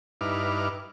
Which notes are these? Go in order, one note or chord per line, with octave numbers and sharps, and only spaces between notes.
G2 D#4 E4 B4 D6 F6